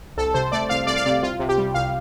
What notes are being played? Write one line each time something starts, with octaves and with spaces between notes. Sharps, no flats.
C2 A4
C3 C5
A3 D5
C2 F5
C2 D5
F5
C3 D5
C2 F4
C3
G4
G3
C2 F5